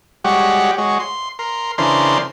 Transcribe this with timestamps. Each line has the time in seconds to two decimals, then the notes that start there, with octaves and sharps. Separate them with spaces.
0.24 G3 G#3 F#4 G4 C#5 F#5
0.78 G#3 F#4 C#5
1.00 C6
1.39 A#4 C6
1.78 C#3 E3 D4 A#4 C5 C6